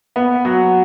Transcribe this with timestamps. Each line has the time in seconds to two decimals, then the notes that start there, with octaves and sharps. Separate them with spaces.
0.16 B3
0.45 F#3